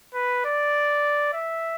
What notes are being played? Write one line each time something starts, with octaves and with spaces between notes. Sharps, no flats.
B4
D5
E5